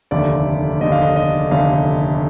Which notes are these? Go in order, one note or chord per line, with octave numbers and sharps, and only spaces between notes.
F1 D#2 D3 D5
F1 D#2 D3 D#5
F5
D#5
D#5
F1 D#2 D3 F5